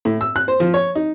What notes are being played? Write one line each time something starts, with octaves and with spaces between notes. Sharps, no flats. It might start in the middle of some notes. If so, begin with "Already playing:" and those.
A2
E6
F#6
C5
F3
C#5
D#4